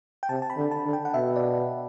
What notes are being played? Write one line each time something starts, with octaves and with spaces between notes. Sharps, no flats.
G5
C3 A5
A5
B5
D3
A5
D3
G5
F#5
B2 E5
D5